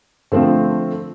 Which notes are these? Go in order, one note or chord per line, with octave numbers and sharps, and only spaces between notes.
D3 F3 A3 C4 C5